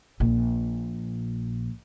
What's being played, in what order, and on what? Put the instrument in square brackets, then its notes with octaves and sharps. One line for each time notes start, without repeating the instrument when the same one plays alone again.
[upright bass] A#1 A#2